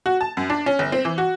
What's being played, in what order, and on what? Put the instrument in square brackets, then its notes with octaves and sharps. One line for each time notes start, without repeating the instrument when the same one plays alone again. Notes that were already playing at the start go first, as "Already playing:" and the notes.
[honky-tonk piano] F#4
A5
F#2
D4
C#4
G1
C4
E3
F#4